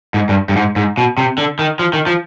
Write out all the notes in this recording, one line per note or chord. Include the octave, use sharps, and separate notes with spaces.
G#2
G2
G2
G#2
G#2
B2
C3
D3
D#3
F3
D#3
F3